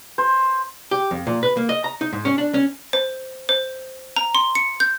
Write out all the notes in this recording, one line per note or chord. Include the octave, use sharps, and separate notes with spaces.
C5
G4
F2
A#2
B4
A#3
D#5
A#5
D#4
G#2
C#4
D4
C#4
C5
C5
A#5
C6
C#7
G6